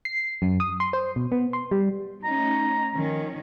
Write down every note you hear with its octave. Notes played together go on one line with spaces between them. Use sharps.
C7
F#2
D#6
C6
C5
B2
B3
C6
G3
A3 C#4 D#4 A#5
D#3 F3 C#4